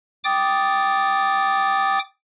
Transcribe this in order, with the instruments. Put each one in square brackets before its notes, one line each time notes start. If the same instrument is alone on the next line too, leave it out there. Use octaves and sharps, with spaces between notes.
[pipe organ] G5 D6 D#6 A6